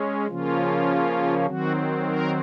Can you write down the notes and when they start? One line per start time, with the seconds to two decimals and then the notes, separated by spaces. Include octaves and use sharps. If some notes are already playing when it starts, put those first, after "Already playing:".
Already playing: G#3 C#4
0.27 C#3 F3 A#3 C#4 F4
1.45 D#3 F#3 C4 F#4
2.05 A#4